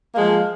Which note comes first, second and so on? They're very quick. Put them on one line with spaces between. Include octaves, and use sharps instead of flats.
A#3 G#3 F3